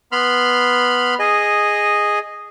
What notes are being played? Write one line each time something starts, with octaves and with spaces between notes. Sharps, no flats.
B3 B5 C6 F6
G#4 D#5